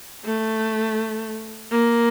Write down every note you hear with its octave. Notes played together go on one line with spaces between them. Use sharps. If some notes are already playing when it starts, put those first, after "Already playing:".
A3
A#3